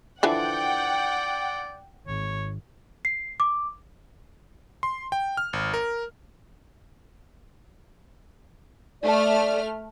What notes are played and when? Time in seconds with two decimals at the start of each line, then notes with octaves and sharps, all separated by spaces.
0.23 D3 E3 F3 D5 F#5 G5
2.07 G#1 C#5
3.05 C7
3.40 D6
4.83 C6
5.12 G5
5.37 F6
5.53 G#1
5.74 A#4
9.02 A3 D5 F6